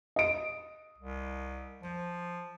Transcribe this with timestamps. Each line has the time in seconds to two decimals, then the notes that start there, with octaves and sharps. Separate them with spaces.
0.16 D#5 D7
0.98 C2
1.83 F3